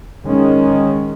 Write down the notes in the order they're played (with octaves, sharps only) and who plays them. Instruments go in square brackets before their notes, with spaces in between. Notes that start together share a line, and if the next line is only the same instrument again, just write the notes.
[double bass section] D#3 G#3 C#4